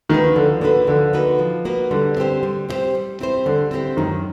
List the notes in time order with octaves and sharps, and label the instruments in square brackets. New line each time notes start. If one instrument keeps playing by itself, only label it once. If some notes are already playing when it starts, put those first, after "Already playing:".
[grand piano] D#3 [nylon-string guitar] A#3 D#4 F#4 B4
[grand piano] D3 [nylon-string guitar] F3
[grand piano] D3 [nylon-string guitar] A#3 D#4 F#4 B4
[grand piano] D3 [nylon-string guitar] F3
[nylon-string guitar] A#3 D#4 F#4 B4
F3
A#3 D#4 F#4 B4
[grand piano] D3 [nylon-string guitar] G3
[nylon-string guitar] C4 E4 G4 C5
G3
C4 E4 G4 C5
G3
C4 E4 G4 C5
[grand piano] D3 [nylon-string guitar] G3
[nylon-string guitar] C4 E4 G4 C5
[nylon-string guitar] F#2 [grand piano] D#3